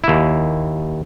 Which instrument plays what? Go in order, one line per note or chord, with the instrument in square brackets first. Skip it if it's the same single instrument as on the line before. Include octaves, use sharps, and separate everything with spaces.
[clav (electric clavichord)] D#2 E4